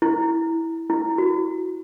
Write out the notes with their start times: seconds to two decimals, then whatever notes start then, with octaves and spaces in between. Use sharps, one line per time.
0.02 E4
0.90 E4
1.18 F#4